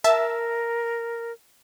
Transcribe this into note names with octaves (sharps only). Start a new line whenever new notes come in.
A#4 E5 A5 E6